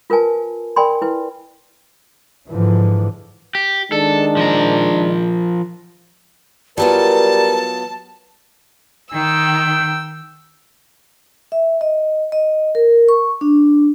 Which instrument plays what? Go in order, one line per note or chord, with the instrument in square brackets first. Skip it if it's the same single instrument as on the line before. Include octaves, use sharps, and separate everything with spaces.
[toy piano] F4 A#4 B4 G#5 A5
A#4 D5 G5 G#5 B5 C6
E4 B4
[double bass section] G#2 D3 E3 F3
[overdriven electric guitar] G4
[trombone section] D#3 G#3 D4 [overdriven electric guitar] A4
[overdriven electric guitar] F3 A#4
[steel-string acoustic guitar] F#3 B3 F4 [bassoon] G3 [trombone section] A#4 [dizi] A5
[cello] D#3 [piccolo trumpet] G5 [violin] E6
[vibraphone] E5
D#5
D#5
A#4
C#6
D4